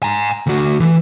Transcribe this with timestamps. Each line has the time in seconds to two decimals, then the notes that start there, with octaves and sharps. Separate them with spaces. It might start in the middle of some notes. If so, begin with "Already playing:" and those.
0.03 G#5 A#5
0.47 D2 F#4
0.80 E3